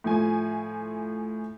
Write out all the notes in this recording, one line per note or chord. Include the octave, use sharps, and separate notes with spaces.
A2 F3 G#5